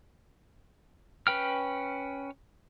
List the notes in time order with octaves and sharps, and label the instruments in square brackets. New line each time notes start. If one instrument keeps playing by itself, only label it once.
[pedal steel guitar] C#4 B4 G5 F6